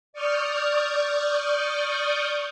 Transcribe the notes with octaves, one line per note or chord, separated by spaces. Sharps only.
D5 C#6 D#6 F6 G6